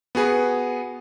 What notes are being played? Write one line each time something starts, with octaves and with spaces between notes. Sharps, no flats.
B3 F#4 G#4 B4